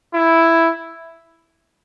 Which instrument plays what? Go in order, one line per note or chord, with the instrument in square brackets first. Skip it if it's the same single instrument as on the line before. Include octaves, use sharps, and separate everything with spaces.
[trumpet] E4